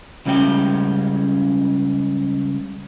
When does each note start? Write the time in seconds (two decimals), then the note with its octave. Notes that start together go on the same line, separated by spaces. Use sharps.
0.26 C#2 C#3 G3 C#4 G5